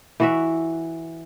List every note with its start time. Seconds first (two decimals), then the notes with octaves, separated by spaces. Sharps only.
0.20 E3 F#4 E5